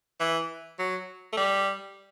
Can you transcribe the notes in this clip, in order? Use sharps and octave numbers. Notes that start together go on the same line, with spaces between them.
E3
F#3
A3
G3